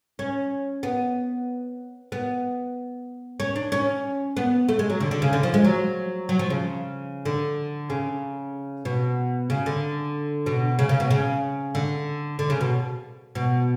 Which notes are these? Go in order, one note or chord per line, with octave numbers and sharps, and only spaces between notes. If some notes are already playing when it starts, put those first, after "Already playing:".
C#4
B3
B3
C#4
D4
C#4
B3
A3
G#3
F#3
D3
D3
C#3
D3
F3
G#3
F#3
F#3
F3
C#3
D3
C#3
B2
C#3
D3
B2
C#3
C#3
B2
C#3
D3
D3
C#3
B2
B2